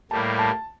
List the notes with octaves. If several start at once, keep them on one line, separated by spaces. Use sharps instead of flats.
A2 G3 A#3 A5
A5